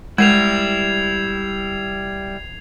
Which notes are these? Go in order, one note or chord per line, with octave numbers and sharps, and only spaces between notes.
G3 G#3 E4 G#6 C7 F7